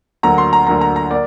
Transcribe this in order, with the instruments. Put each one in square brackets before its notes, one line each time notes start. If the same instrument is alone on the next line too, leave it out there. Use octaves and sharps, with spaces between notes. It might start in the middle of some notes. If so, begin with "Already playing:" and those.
[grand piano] D2 D3 F#3 A#3 A#5
C6
A#5
D2 D3 F#3 A#3 A#5
A#5
A#5
A#3 D5